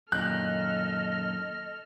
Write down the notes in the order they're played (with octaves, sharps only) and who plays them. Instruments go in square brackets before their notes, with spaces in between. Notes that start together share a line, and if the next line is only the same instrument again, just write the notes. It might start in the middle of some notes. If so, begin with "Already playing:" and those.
[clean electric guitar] F#2 A#2 D#3 [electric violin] A4 F6 [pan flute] D#5 [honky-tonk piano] F#6